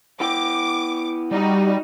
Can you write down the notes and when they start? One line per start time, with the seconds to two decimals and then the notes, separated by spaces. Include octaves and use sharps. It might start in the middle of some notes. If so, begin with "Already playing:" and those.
0.20 B3 E4 G5 D6
1.31 G3 D#4 F#4